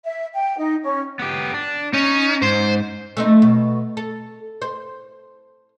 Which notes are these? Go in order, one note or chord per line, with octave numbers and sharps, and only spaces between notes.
E5
G5
D#4
C#4
B3 G4
D4
C#4 D#4
G#2 C5
A3 C4 D#4
B2
A4
C5